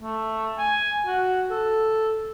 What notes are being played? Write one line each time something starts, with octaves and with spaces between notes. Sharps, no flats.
A3
G#5
F#4
A4